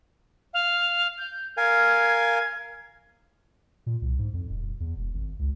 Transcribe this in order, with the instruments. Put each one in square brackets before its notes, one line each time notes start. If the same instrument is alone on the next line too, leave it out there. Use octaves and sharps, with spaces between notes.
[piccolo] F5
G6
[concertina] A#4 F5 G#5 [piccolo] G#6
[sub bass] A#2
C2
G#2
F2
D#1
E2
E1
G#1
C#2